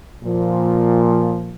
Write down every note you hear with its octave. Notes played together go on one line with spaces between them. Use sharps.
A#2 F3